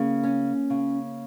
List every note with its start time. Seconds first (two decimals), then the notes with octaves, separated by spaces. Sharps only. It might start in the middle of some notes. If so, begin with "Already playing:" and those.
Already playing: C#3 A#3
0.23 C#4
0.70 C#3